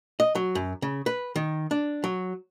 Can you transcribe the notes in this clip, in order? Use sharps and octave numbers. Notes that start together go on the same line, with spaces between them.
D#5
F#3
F#2
C#3
B4
D#3
D4
F#3